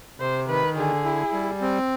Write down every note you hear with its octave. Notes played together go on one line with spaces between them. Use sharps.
C3 C5
D#3 B4
D3 G#4
E4
G3
C4